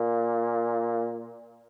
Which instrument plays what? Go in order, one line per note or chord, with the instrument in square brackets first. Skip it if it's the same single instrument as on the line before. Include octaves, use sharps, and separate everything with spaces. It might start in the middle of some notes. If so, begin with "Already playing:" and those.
Already playing: [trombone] A#2